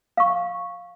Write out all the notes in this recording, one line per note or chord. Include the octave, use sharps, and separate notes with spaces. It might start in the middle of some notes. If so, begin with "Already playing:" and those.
F5 C#6